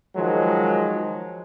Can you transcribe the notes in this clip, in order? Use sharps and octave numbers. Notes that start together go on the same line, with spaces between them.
D#3 F3 F#3 G#3